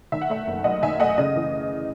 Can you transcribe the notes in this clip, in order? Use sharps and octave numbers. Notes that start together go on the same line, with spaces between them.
D#3 E5
F#5
A3 E5
F#1
F#2 D#5 F#5
D#3 E5 G#5
A3 D#5 F#5
C#3 D#5
E3